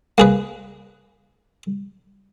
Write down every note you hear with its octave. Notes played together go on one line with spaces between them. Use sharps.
A#3 G#4 B4